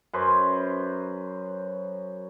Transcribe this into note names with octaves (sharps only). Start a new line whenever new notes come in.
F#2 C#4 B4 C5